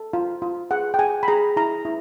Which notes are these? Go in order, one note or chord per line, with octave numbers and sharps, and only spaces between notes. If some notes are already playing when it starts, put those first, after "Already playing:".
Already playing: A4
F4
F4
G#4 F#5
G5
G#4 G#5
B5
G#4 A#5
E4 A#5
E4